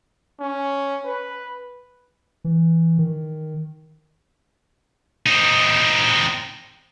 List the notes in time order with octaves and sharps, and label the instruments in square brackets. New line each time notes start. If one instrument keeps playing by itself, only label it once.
[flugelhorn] C#4
B4
[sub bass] E3
D#3
[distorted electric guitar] C4 D#4